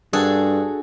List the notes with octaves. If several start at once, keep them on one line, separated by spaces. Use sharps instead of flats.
G2 D4 F#4 G#4 A4